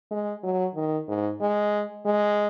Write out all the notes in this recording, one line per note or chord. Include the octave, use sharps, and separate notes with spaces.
G#3
F#3
D#3
G#2
G#3
G#3